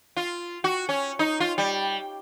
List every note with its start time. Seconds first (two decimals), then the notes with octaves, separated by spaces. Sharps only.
0.17 F4
0.64 F#4
0.89 C#4
1.19 D#4
1.40 F4
1.58 G3